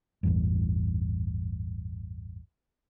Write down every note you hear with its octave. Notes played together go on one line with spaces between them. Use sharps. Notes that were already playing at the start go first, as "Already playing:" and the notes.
A1 E2 G2